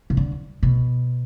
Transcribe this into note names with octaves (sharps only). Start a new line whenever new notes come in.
C3
D3
B2